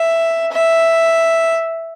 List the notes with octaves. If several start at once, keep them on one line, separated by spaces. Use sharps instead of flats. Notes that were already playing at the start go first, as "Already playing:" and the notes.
Already playing: E5
E5